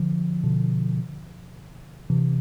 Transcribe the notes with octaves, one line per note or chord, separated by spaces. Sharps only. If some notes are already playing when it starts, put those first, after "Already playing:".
Already playing: D3 F3
B2 D3
C3 E3